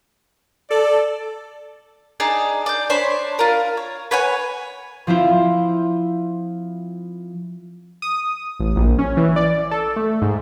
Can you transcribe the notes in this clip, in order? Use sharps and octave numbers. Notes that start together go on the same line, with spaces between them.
A4 D5
D4 D#4 G#4
D5 G6
D4 C5 C#5 B5
F4 A#4
C#5
B4 C#5 F#5 G#5
F3 C4 E4 F4
D#6
A1
A#1
C#4
E3
D5
A4
A3
G#2